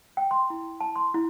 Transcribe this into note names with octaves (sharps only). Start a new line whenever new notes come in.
G5
C6
E4
A5
C6
E4